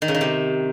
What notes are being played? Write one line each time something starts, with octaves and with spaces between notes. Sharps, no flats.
D#3
C#3
D#3
C3